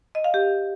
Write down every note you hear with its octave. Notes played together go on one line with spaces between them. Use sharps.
D#5
F5
G4